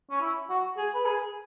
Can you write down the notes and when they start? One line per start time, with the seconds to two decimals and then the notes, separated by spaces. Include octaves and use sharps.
0.11 C#4
0.21 E4
0.49 F#4
0.77 G#4
0.95 B4
1.05 G#4